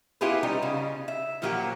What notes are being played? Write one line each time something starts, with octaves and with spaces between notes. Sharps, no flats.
B3 E4 F4 G4 G#4 B4
G3 C#4 D#4
C#3
E5
A#2 F3 F#3 A#3 F#4 G4